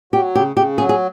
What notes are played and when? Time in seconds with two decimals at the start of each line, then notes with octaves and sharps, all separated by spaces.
0.13 F#3 G4
0.35 C#3 G4
0.56 C#3 G4
0.78 F#3 G#4
0.89 G#4